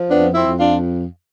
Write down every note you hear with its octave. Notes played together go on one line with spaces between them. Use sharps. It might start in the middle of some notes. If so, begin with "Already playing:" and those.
Already playing: F3
F2 B3 D4
C4 E4
F2
D4 F4